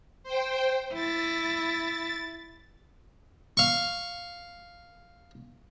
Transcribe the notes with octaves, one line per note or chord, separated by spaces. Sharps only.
C5 G5
E4 A6
F5 C#6